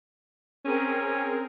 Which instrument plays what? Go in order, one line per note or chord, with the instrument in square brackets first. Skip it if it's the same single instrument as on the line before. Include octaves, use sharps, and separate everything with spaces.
[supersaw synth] C4 G#4 A#4 [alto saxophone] C#4